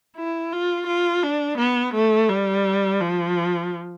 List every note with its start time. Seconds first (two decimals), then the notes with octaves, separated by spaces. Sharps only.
0.17 E4
0.53 F4
0.87 F4
1.23 D4
1.58 B3
1.95 A3
2.29 G3
3.01 F3